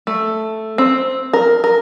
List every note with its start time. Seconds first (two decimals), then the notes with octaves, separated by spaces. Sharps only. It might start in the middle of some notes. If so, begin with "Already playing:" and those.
0.07 A3
0.78 C4
1.33 A#4
1.64 A#4